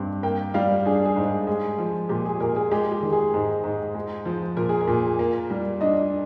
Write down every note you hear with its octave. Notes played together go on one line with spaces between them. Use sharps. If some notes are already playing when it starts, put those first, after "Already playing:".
Already playing: G2 C4
A#3 G5
G3 F5
D4 G#4
G#4
G#2
G#3 G#4
F3
A#2 G4
G#4
A#2 A#4
G#4
G#3 G4
G4
D#3
G#4
G#2
G#2
G#3
F3
A#2 A#4
G#4
A#4
A#2
A#3
G3
D4 D#5